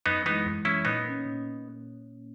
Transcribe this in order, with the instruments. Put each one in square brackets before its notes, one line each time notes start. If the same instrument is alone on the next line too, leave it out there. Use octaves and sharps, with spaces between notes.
[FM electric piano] F#2 [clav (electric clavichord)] B3 D#4
[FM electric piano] E3 G#3 [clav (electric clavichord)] B3 D#4
[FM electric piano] F#2
[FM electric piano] E3 G#3 [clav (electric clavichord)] C#4 E4
[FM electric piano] A#2 [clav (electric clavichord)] B3 D#4
[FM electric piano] A#3 C#4
A#2